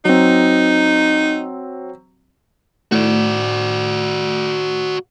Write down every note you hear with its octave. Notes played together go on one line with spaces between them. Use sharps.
F#3 C4 D#4
A2 F#4 D5